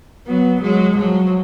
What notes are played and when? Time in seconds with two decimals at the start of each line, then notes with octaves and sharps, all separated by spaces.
0.27 F#3 B3
0.62 F#3 G#3
0.97 F3 F#3